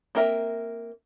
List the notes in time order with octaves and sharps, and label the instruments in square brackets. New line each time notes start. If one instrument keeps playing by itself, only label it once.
[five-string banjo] A#3 C4 A#4 E5